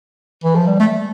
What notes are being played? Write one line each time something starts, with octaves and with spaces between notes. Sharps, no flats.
E3
F3
G3
A3